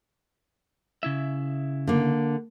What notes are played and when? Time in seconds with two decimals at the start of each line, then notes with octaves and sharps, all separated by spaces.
1.03 C#3 E4 E5
1.87 D3 A#3